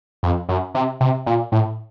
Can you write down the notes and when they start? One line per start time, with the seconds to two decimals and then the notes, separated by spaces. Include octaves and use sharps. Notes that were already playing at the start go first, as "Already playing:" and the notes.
0.23 F2
0.49 F#2
0.75 C3
1.01 C3
1.26 A#2
1.52 A2